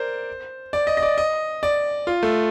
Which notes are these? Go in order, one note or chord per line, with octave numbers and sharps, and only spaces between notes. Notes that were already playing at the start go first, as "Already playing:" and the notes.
Already playing: A#4 C5 D5
D5
D#5
D#5
D5
D#5
D5
F4
A3